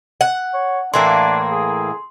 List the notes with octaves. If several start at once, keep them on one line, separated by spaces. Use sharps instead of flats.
F#5
C#5
A2 E3 A#3 D4 C6
G#4